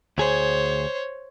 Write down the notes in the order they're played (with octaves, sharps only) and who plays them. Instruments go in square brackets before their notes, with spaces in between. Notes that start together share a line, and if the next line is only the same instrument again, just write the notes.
[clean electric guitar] D2 G#4 [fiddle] C5 C#5